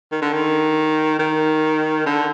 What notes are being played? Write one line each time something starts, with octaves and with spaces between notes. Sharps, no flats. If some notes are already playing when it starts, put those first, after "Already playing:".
D#3
D3
D#3
D#3
D3